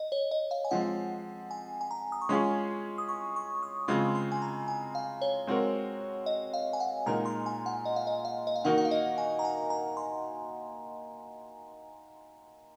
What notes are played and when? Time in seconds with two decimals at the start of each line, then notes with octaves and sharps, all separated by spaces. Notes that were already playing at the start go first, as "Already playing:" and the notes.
Already playing: D#5
0.12 C#5
0.31 D#5
0.51 F5
0.65 G#5
0.71 F3 G#3 C4 F#5
1.51 G#5
1.81 G#5
1.91 A#5
2.12 D#6
2.21 C#6
2.29 G#3 C#4 F4 G#4 C6
2.98 D#6
3.09 C#6
3.36 C#6
3.63 D#6
3.88 C#3 G#3 C4 F4 C6
4.15 C6
4.32 G#5
4.42 A#5
4.68 G#5
4.95 F5
5.22 C#5
5.47 G#3 C4 F#4 A#4
6.26 D#5
6.54 F5
6.73 G#5
6.80 F#5
7.06 A#2 G#3 D#4 A#4 A#5
7.25 C6
7.46 G#5
7.66 F#5
7.85 D#5
7.96 F5
8.07 D#5
8.25 F5
8.47 D#5
8.56 F5
8.64 D#3 A#3 D#4 F#4 A#4 F#5
8.78 F#5
8.85 F5
8.91 D#5
9.18 G#5
9.39 A#5
9.45 G#5
9.70 A#5
9.97 C6